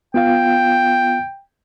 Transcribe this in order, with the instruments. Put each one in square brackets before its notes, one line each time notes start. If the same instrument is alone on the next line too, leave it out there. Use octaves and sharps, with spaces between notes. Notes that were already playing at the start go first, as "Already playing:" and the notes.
[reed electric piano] B3 F4 F5 [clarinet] G5